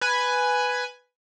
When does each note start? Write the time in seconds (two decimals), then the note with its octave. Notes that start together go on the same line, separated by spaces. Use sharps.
0.01 B4 G#5